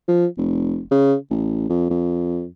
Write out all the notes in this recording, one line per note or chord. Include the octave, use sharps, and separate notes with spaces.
F3
F1
C#3
A1
F2
F2